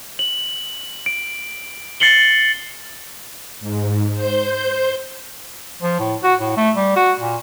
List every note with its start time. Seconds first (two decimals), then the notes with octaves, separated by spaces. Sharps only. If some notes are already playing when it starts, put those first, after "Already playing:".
0.19 F#7
1.06 D7
2.00 A6 C7 C#7 F#7 G7
3.60 G#2
4.13 C5 G6
5.82 F3
5.99 A2
6.23 F#4
6.40 A2
6.57 A3
6.76 G3
6.96 F#4
7.20 A#2